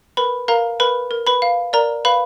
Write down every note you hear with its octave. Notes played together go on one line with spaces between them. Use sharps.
A#4 B4 B5
A#4 F5 A#5
A#4 B4 B5
A#4
B4 B5
F5
A#4 D5 A#5
B4 F5 B5